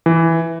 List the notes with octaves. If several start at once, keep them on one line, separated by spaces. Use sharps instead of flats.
E3